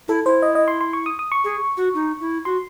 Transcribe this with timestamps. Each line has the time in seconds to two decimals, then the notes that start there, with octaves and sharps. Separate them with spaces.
0.08 E4 A4
0.26 E4 C5
0.42 D#5
0.55 D#5
0.68 C6
0.81 C6
0.93 C#6
1.06 D#6
1.19 D#6
1.32 C#6
1.44 G#4
1.77 F#4
1.94 D#4
2.21 E4
2.45 F#4 C6